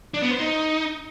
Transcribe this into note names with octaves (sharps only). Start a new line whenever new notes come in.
D4
B3
C5
D#4